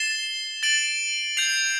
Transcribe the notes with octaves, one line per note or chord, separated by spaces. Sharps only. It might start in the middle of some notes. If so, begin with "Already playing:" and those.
Already playing: A6 C7 E7 G7
A6 D7 F#7
G6 C7 F7